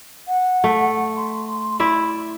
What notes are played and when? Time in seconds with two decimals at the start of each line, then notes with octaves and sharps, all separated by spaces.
0.28 F#5
0.64 A3
1.17 C6
1.80 E4 D5 E5